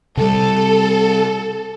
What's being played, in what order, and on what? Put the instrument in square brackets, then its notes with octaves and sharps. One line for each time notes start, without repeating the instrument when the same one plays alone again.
[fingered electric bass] C3 G3 [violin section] A4